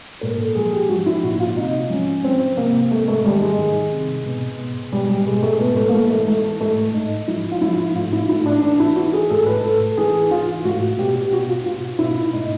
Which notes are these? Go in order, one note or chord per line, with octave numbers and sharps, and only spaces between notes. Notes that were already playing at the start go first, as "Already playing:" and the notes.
A#2 A#4
A4
F3 G#4
G4
F3 F#4
E4
A#2 F#4
F4
C3 D#4
F3 C#4
F3 C4
C3 A#3
C3 A3
A3
D#3 G3
G#3
D#3
C3
B2
B2
B2 G3
G3
B2 G#3
A3
A2 B3
A3
A#3
E3 A3
A3
E3 A3
A2 A3
A2 D#4
F3 E4
F4
F3 E4
A2 F4
E4
A2 E4
D4
E3 D4
E4
E3 F#4
G#4
A2 A4
B4
A2 A4
E3 G#4
E3 F4
A2 F#4
B2 G4
G4
B2 F#4
F4
B2 F4
B2 E4
A2 D#4